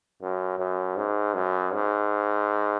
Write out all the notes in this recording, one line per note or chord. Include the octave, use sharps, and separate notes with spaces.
F#2
F#2
G#2
F#2
G#2